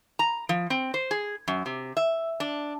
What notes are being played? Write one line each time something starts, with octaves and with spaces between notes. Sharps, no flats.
A#5
F3
C4
C5
G#4
F#2
C3
E5
D4